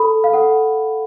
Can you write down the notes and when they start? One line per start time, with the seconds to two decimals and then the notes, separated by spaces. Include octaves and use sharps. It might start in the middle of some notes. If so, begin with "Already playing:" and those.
Already playing: A4 B5
0.24 F5
0.33 A4 F#5